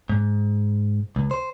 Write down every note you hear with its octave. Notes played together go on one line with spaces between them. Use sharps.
G#2
C#2
C5